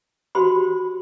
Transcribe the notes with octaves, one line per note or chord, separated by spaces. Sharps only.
F#4 G4 C5 B5 C6